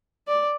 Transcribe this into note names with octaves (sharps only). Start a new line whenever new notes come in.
D5